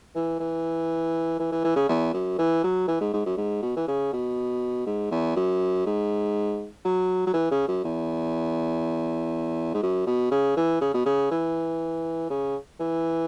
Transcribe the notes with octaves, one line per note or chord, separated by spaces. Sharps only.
E3
E3
E3
E3
E3
C#3
E2
F#2
E3
F#3
E3
G#2
G#2
F#2
G#2
B2
E3
C#3
B2
G#2
E2
F#2
G#2
F#3
F#3
E3
C#3
F#2
E2
G#2
F#2
B2
C#3
E3
C#3
B2
C#3
E3
C#3
E3